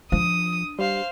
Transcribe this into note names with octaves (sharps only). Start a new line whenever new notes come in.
F3 D4 D#6
G3 C5 F5